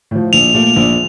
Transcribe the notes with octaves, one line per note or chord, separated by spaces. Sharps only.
A2 F3
A#1 F7
A#2 A3
A#1